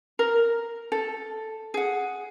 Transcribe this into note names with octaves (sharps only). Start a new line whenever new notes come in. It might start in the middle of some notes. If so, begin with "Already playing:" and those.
A#4
A4
G#4 F#5